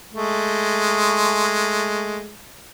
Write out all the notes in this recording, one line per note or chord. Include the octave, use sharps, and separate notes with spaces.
G#3 A3